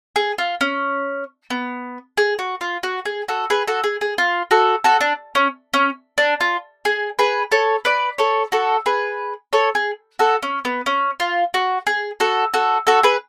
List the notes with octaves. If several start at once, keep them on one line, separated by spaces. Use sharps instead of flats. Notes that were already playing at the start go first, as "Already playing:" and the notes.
G#4
F4
C#4
B3
G#4
F#4
F4
F#4
G#4
F#4 A4
G#4 B4
F#4 A4
G#4
G#4
F4
F#4 A4
F#4 A4
D4
C#4
C#4
D4
F4
G#4
G#4 B4
A4 C#5
B4 D5
A4 C#5
F#4 A4
G#4 B4
A4 C#5
G#4
F#4 A4
C#4
B3
C#4
F4
F#4
G#4
F#4 A4
F#4 A4
F#4 A4
G#4 B4